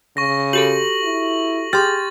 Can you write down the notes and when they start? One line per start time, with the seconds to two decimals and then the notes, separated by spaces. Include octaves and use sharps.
0.17 C#3 C#6 A#6
0.53 F#4 G4 A4 F#7
1.03 E4
1.73 G4 G#4 C6 F6 A6